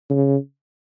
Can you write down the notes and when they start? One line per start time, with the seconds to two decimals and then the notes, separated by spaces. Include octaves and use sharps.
0.10 C#3